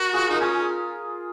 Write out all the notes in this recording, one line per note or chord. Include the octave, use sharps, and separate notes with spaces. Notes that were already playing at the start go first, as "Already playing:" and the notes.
Already playing: F#4 A#4
F4 G#4
D#4 A#4
C#4 F4 G#4